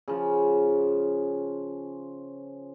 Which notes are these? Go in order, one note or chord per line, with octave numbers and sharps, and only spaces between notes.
C#3 F3